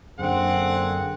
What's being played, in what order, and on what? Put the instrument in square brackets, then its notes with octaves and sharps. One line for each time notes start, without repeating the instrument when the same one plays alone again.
[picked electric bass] F#2 [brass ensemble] D3 A#3 [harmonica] C4 [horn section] G#4 F#5